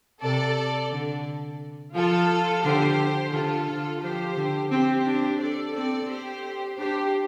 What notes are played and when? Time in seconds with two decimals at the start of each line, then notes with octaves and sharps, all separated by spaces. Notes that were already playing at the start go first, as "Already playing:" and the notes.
0.22 C3 A4 D5
0.91 D3
1.94 F3 F4 A4
2.63 D3 G4 C5
3.32 D3 F4 A4
3.67 D3
4.01 F3 G4 C5
4.36 D3
4.71 C4 G4 C5
5.05 D4
5.39 A4 D5
5.74 C4 A4 D5
6.08 G4 C5
6.78 D4 G4 C5